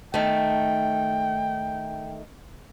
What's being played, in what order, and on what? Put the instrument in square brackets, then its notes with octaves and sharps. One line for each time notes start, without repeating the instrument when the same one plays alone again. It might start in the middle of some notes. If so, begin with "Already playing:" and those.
[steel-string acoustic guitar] D#3 A3 [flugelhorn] G5